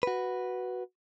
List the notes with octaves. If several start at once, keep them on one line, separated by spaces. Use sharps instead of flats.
F#4 B4